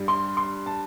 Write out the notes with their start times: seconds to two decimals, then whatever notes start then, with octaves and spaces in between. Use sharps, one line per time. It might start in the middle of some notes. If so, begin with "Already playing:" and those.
Already playing: G2 G3
0.08 C6
0.37 C6
0.66 A5